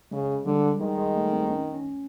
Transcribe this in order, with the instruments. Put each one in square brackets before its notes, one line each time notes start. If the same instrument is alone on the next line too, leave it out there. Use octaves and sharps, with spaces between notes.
[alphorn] C#3 [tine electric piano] G#3
[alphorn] D3 [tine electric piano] G3
[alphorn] D#3 [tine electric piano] G#3
[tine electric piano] G#3
A3
C4
C#4
C#4